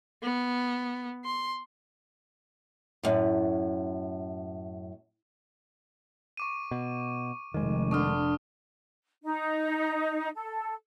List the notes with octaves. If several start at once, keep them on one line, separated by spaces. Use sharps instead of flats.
B3
C6
F#2 A2
C#6 D6 D#7
B2
F1 F2 D#3 G#3
D3 D4 C#6 D#6 F6
D#4
A4